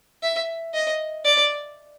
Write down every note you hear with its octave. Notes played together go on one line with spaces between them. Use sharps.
E5
D#5
D5